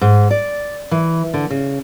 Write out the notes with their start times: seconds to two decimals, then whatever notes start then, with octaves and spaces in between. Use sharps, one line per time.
0.01 G#2
0.31 D5
0.91 E3
1.34 D3
1.50 C#3